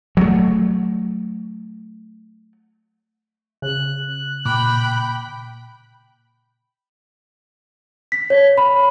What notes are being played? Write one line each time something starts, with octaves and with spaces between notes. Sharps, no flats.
F#3 A3
C#3 F#6
A#2 G5 B5 D6
B6
C#5
B5